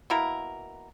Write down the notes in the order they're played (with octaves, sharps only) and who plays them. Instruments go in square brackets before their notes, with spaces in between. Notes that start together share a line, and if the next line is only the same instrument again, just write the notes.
[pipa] B2 A#3 E4 A#4